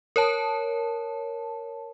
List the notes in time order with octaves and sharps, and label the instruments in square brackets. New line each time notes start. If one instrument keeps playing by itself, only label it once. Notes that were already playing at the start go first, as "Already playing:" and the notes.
[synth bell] A#4 C#5 A5